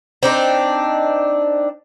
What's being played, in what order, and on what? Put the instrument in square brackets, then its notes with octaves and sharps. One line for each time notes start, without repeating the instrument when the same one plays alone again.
[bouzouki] C4 D4 D#4